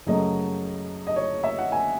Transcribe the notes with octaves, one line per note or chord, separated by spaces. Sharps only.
F#2 C#3 F#3 A3 D#5
D#5
C#5
E5
F#5
G#5